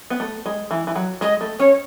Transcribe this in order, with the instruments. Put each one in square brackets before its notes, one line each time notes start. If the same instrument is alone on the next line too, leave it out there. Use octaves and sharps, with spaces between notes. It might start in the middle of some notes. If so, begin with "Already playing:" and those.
[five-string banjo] B3
A3
G#3
E3
E3
F#3
[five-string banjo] G#3 [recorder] D#5
[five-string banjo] A3
[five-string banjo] C#4 [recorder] C#5